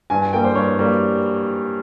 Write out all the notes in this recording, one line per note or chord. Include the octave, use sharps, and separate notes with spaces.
G2 G#5
G#5
G3 A#3 G5
C5
G2 C#5
G3 A#3